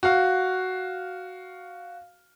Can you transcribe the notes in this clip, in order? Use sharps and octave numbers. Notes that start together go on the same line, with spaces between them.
F#4 F5